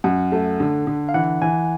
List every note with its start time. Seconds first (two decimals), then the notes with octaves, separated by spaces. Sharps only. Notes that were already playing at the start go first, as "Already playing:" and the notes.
0.04 F#2 F#5
0.32 A3
0.60 D3
0.87 D3
1.09 F5
1.14 E3 F#5
1.42 E3 G#5